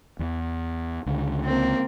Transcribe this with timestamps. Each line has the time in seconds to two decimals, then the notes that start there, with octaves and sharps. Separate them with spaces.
0.19 E2 E3
1.06 C#2 D3
1.44 A#3 C4